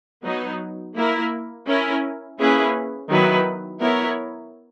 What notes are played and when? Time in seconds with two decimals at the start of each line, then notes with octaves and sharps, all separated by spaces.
0.23 F#3 B3 D#4
0.95 A#3 E4 A#4
1.66 C#4 E4 A#4
2.38 A#3 C#4 E4 G#4 B4
3.10 D#3 F#3 B3 E4 B4
3.80 B3 E4 A#4 C#5